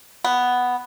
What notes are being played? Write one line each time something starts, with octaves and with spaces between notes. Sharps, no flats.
B3